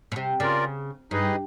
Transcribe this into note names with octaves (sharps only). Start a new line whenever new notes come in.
B2
C3
C#3 F4 A#4 D5
G2 D#4 G#4 B4 D#5